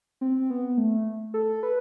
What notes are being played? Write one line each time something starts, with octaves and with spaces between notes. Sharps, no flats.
C4
B3
A3
A4
B4